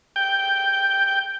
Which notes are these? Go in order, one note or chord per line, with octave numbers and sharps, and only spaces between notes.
G5